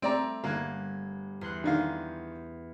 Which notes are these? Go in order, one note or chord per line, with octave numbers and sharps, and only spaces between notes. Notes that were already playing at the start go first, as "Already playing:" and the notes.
A3 C4 D5 A#5
G1 A#3 F#6 G#6
E2 C6 F#6
D3 D#3 F5